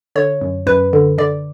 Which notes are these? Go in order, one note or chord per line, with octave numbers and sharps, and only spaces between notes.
D3 C#5
F#2
F#2 B4
D3
D3 D5